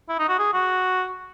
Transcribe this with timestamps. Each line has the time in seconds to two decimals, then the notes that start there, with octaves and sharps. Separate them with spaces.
0.09 E4
0.19 D#4
0.29 F#4
0.39 G#4
0.53 F#4